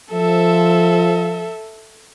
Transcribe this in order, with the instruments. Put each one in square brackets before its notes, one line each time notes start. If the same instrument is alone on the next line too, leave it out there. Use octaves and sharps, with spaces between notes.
[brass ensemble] F3 [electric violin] A4 E5